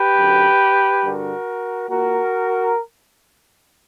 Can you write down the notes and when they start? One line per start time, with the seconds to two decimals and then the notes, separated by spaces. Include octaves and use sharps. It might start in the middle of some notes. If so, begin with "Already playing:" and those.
Already playing: G4 B4
0.17 F#2 D3
1.03 G2 D3 F#4 A#4
1.89 A#2 F#4 A#4